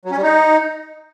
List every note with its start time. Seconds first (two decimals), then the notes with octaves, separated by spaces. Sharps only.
0.05 F#3
0.11 C#4
0.17 G3
0.23 D#4